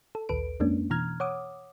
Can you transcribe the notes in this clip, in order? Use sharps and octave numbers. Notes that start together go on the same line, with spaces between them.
A4
A#1 D#2 A4 B4 D7
F2 G#3 A#3 C#4 D4
B2 E3 A#5 F6 G#6
C#5 F#5 D6 D#6